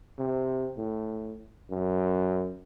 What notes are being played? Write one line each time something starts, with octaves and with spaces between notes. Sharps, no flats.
C3
A2
F#2